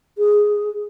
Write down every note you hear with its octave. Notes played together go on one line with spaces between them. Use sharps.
G#4